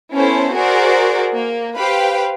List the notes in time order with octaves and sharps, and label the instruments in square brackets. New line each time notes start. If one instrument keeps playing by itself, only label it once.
[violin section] B3 C#4 E4 A4 C5
F#4 G#4 A#4 C5 D5
A#3
G4 B4 C5 F5 G5 B5